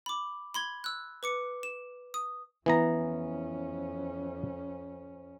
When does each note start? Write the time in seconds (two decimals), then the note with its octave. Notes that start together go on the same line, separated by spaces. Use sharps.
0.06 B5 D6
0.54 B5 C6 G#6
0.84 E6 F#6
1.23 B4 D6 C#7
1.63 E7
2.14 D#6
2.66 F2 E3 B3 C#4 A#5